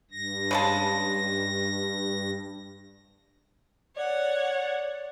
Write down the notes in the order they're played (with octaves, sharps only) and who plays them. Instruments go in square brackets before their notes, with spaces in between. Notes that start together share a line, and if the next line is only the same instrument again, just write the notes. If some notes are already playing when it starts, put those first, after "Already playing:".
[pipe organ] G2 A#6
[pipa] C#3 G#3 A5
[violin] C#5 F#5 [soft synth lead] D5